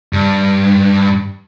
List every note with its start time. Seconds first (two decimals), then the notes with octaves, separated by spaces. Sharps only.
0.13 G2